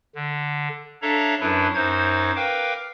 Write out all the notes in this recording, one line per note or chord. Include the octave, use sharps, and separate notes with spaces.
D3
D4 A4 C#5 E5 F5 A#5
F#2 F#3 D4 E4 B4
F#2 D#4 C5 G#6
A#4 B4 F5 G5 D6